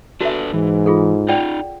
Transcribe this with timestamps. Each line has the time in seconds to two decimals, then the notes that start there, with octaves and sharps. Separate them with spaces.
0.21 D4 F#4 A4 B4 E5
0.53 G#2 E3
0.86 F4 G#4 A4
1.28 D#4 F4 D5 F#5 G5